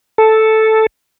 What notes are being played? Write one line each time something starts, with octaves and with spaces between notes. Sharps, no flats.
A4